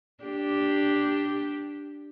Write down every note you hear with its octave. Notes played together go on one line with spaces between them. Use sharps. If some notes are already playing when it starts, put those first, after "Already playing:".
D4 G4